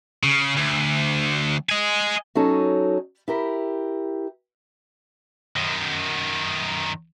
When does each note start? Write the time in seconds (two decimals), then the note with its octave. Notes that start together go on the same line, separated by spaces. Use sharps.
0.23 C#3
0.57 D2
1.69 D#5 G#5
2.35 F#3 C#4 D#4 A4
3.28 E4 G4 A#4
5.56 F#2 D#3